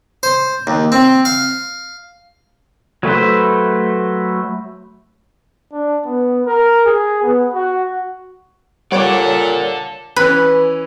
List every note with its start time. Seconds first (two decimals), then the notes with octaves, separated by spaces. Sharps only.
0.23 C5
0.67 D#2
0.92 C4
1.25 F5
3.03 F#3 A3 B4 C5
5.72 D4
6.06 B3
6.46 A#4
6.86 G#4
7.23 B3
7.54 F#4
8.92 A#2 G3 A4 C#5 D5 F#5 D6
10.16 E3 C#4 B4